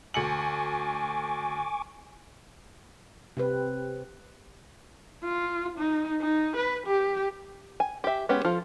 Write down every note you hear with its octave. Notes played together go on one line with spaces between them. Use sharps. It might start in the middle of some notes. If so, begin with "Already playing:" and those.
D2 G#5 C#6 D6 C#7 F#7
C3 C4 B4
F4
D#4
D#4
B4
G4
G#5
G4 E5
G#3 B3 C#4 G4
F3 F4 A4